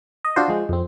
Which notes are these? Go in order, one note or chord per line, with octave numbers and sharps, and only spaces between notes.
D#5
D4 F4 F#4 C5
F3 G#3
F2 C4